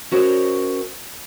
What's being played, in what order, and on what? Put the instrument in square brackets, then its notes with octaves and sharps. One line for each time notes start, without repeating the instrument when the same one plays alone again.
[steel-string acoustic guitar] C#4 F#4 A#4 C5 C#5 D#5